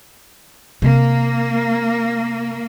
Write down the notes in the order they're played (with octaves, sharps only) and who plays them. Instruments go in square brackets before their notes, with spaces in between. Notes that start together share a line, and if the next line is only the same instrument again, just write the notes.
[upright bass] C3 [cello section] A#3